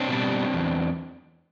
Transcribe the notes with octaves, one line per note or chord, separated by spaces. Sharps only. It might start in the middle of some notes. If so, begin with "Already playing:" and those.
Already playing: C4 D4
B2 G3
E2